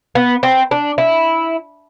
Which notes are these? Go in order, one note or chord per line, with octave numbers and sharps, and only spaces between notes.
B3
C4
D4
E4